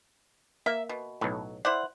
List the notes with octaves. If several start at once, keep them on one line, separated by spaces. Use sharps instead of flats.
A#3 E5
B2
B1 A2 F#3
E4 C5 D5 F#5